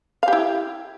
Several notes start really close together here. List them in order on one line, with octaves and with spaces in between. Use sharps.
F5 G4 E4